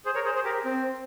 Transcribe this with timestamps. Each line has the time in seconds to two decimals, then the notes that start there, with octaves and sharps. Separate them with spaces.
0.05 G#4 C5
0.15 A#4 C#5
0.25 G#4 C5
0.35 G#4 C5
0.44 G4 A#4
0.65 C4